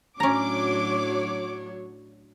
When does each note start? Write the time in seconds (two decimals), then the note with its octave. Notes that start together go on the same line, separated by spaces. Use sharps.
0.20 A2 F#3 C#4 D4 C#5 A#5 D6